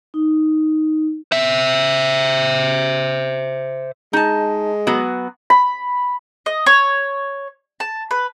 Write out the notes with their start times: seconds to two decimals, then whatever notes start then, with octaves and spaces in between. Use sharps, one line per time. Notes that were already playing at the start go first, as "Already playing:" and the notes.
0.14 D#4
1.32 C5 E5
4.13 G#3 D#4 A5
4.87 F#3 B3 F#4
5.50 B5
6.46 D#5
6.66 C#5
7.80 A5
8.11 B4